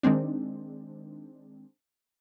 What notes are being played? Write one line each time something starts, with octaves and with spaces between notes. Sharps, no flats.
D#3 G#3 C4 D4